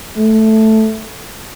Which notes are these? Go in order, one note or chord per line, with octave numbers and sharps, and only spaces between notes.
A3